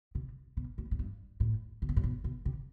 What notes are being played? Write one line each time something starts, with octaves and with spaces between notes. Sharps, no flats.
C3
B2
A2
A2
G2
A2
C3
B2
A2
B2
B2
C3